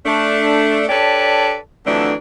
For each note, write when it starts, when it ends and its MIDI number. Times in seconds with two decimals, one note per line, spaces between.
0.06 0.85 57
0.06 0.85 62
0.89 1.55 62
0.89 1.55 67
0.89 1.55 69
0.89 1.55 71
0.89 1.55 73
0.89 1.55 74
1.86 2.13 41
1.86 2.13 50
1.86 2.13 52
1.86 2.13 54
1.86 2.13 57
1.86 2.13 62